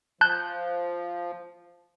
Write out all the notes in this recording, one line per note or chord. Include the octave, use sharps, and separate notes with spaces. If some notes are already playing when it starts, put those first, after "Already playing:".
F3 A5 F#6 G6